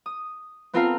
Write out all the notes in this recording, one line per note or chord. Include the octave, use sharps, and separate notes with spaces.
D#6
B3 C4 F4 A4 A#4 F5